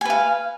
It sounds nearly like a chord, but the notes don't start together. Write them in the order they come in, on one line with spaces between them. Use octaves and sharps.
G#5 B4 F5